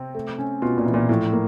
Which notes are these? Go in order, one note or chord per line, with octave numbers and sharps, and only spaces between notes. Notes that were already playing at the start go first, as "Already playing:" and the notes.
Already playing: C3 C4
A3
C#4
B2 F4
A#2
E3
A#2
A2 F3
A#3